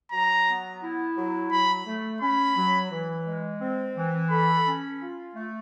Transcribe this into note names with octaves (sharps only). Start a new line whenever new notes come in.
F#3 A#5
B3
E4
F#3
F#3 B5
A3
C#4 B5
F#3
E3
G#3
C4
E3
A4 B5
C#4
F4
A3